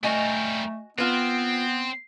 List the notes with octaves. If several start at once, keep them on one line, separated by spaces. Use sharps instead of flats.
G3 A3 F#4 A#4 D#5 G#5
B3 C4 F4 B4